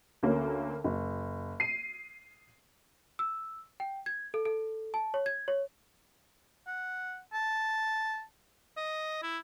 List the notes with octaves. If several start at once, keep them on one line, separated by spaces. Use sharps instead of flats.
D2 D3 A#3 C#4
F#1
C7 D#7
E6
G5
G#6
A4
A4
A5
C#5
G#6
C#5
F#5
A5
D#5
E4